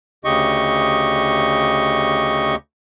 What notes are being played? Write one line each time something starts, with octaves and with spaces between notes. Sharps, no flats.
D2 C#3 G4 D#5 C#6